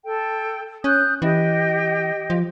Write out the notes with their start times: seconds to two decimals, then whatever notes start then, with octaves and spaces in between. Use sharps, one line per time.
0.04 A4 G5
0.84 C#4 D#6 F#6 G6
1.22 E3 G4 D#5 G5
2.30 F3